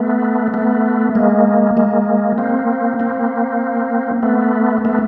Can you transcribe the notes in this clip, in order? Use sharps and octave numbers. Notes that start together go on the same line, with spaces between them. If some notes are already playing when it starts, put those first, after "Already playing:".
Already playing: A3 B3
A3 B3
G#3 A#3
G#3 A#3
A#3 C4
A#3 C4
A3 B3
A3 B3